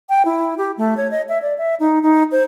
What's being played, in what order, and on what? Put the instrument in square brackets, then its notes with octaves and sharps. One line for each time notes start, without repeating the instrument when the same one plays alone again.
[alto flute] G5
E4
G4
A3
C#5
D#5
E5
D5
E5
D#4
D#4
C5